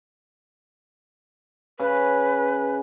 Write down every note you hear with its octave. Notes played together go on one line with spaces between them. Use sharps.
C#3 B4